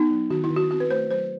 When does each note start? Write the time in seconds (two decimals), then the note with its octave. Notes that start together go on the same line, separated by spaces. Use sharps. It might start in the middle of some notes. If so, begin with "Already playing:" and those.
Already playing: B3 D#4
0.10 F#3
0.30 D#3 F#4
0.44 E4
0.51 D#3
0.57 F#4
0.71 C4 F#4
0.80 B4
0.90 A3 C5
1.10 F#3 C5